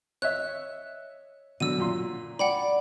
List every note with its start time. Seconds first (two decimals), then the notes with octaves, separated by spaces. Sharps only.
0.22 C#5 D#5 E5 F#6
1.60 B2 D3 F#3 E6 D#7
1.78 F#2 A#2 C6
2.39 D5 F#5 G5 B5